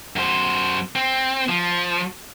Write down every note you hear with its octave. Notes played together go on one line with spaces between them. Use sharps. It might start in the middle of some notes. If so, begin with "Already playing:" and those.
F#2 C5
C4
F3